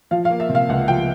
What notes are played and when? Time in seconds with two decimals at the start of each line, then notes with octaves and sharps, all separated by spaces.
0.11 F3 F5
0.25 F5
0.30 A#3
0.40 E5
0.49 C3
0.55 F5
0.69 C#2 F#5
0.88 F3 G5